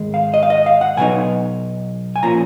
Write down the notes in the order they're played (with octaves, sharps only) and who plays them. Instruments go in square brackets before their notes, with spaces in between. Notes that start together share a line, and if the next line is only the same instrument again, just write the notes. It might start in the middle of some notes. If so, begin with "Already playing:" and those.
Already playing: [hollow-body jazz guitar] G#2 D#3 G#3
F5
D#5
F5
D#5
F5
F#5
B1 B2 F#3 B3 D#4 G#5
G#5
A#2 F3 A#3 C#4 A#5